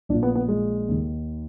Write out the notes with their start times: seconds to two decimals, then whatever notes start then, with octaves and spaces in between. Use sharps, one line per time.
0.09 A#1 D4
0.13 A#2
0.23 B3
0.35 B3
0.48 G#3
0.88 D#2 D#3